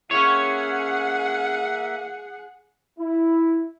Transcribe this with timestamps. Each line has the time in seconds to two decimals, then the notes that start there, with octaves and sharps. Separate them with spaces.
0.11 A#3 C#4 G#4 C#5 E5 F#5
2.99 E4